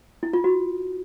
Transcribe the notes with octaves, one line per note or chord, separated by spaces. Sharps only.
E4
F4
F#4